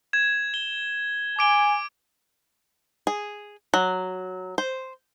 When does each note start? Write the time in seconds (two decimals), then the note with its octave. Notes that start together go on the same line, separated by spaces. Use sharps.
0.13 G#6 E7
0.54 G7
1.39 G#5 D6 D7 G7
3.07 G#4
3.74 F#3
4.58 C5